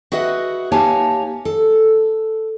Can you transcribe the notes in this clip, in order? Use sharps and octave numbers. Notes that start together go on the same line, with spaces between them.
F#4 G#4 B4 D#5 E5 F#5
A#3 D#4 G4 C#5 G#5 A5
A4